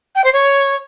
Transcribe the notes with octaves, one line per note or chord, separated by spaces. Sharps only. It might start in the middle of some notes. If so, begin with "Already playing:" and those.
G5
C5
C#5